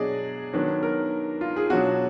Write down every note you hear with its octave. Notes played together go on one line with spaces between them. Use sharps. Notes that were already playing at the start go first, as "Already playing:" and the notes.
Already playing: B2 F#3 D4 G#4 D5 D#5
D#3 F#3 B3 D4
A#4
F4
G#4
B2 F#3 D4 F#4